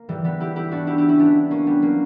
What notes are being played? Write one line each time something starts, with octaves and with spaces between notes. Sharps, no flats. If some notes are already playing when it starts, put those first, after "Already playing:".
Already playing: A#3
E3 G3
G3 B3
E4 G4
E4 G4
D4 F#4
E4 G4
E4 G4
C#4 E4
B3 D4
A#3 C#4
G3 B3
F#3 A#3